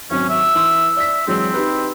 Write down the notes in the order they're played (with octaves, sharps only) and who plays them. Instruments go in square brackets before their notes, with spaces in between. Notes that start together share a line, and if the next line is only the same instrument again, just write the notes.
[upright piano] G#1 F#3 [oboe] C#4
[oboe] E5
[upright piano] E3 C6 E6
[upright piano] D5 B6 [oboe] E5
[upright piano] E3 F#3 G#3 [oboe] C4
[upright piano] D#4 G4 B4